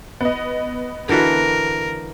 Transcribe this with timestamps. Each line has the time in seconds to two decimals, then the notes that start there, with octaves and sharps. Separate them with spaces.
0.21 B3 D#5
1.09 D3 E3 F#4 A#4